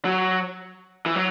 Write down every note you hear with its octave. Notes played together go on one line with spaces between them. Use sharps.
F#3
E3
F#3